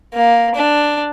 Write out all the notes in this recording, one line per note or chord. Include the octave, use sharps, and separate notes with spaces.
A#3
D4